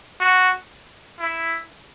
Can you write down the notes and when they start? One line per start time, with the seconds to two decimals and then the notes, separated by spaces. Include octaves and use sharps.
0.20 F#4
1.19 E4